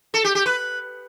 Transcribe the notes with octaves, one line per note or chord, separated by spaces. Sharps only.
A4
G4
G4
B4